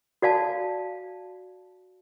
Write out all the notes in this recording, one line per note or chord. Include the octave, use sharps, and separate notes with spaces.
F#4 D5 F5 A5